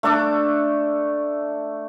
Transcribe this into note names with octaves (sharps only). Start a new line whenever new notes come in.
A3 D4 A4 D6